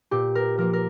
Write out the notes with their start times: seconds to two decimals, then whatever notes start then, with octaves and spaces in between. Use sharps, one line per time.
0.11 A#2 G4
0.35 A#4
0.58 F3 A#3 A#4
0.73 A#4